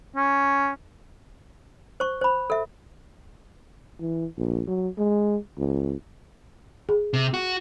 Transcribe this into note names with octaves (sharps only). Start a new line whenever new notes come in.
C#4
C5 C#6
C5 B5
A4 E5
E3
A#1
F#3
G#3
C#2
G#4
C3
F#4